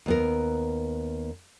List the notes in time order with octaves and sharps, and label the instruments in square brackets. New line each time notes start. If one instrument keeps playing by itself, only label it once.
[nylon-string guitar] D#2 B3 A#4